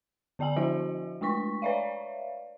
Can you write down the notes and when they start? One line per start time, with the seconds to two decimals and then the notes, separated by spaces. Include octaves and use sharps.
0.39 D3 B3 D5 G5 G#5 F#7
0.56 F3 E4 F#4 C5 D#5 E5
1.21 G#3 A3 D4 C#6 B6
1.62 B4 C#5 D5 E5 F5